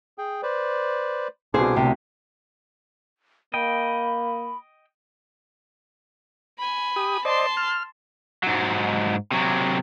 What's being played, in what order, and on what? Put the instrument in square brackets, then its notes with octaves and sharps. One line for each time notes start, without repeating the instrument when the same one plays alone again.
[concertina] G#4 G5
B4 C5 D5
[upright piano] C2 B2 [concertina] D4 D6 [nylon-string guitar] G#4 C5
[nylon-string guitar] D2 C3
[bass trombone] A#3 [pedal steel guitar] D#5 G5 [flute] B5
[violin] G#5 B5
[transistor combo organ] G4 D#6
[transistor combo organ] C5 D5 D#5 [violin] A5 C6
[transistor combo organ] F6
[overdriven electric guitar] G#2 F#3
C3 F#3